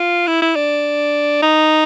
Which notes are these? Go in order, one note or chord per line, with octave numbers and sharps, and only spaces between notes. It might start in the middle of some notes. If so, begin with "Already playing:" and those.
Already playing: F4
E4
E4
D4
D#4